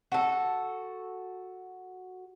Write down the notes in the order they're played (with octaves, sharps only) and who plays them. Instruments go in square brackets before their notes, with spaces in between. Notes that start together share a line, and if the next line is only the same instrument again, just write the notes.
[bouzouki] F#4 A4